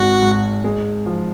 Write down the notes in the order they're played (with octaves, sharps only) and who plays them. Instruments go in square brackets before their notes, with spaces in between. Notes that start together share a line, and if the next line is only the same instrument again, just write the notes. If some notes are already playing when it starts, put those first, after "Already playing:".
Already playing: [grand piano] G#1 G#3 [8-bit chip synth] F#4
[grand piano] G#2
G#3
F3